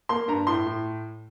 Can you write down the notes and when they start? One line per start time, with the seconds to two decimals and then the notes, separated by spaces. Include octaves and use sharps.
0.09 A#3 C6
0.28 G2 A#5
0.47 A2 C6
0.67 A2